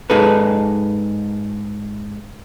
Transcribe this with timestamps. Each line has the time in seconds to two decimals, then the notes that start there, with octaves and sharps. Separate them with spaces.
0.10 G#2 D#4 G#4 A4 B4